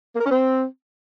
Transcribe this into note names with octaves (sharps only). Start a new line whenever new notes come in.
A#3
A#4
C#4
C4